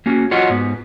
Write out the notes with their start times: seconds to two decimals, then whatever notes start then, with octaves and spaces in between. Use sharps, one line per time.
0.06 A#3 C#4 F#4
0.31 F4 F#4 C#5 D#5 F#5
0.50 G#2 B3